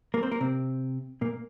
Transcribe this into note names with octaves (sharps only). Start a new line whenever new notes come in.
A#3 A#4
C4 C5
A#3 A#4
C3 C4
A#2 A#3